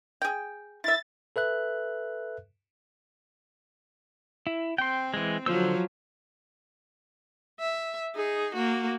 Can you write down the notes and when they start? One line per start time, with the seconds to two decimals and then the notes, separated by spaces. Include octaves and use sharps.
0.22 G#4 G5
0.84 E4 E5 A6
1.36 A4 B4 E5 F#6
4.47 E4
4.78 C4 G5 C6
5.14 E3 G#3
5.46 D3 F3 F#3 C5 E6
7.60 E5
8.15 D#4 G#4
8.55 A#3 F#4